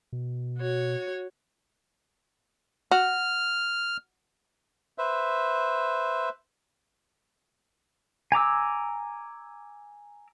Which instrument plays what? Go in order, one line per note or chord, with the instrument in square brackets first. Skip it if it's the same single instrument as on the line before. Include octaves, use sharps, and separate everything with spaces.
[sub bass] B2
[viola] F#4 C#5
[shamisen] F#4 [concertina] F6
[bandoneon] B4 C5 E5
[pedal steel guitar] G#5 A#5 D6 E6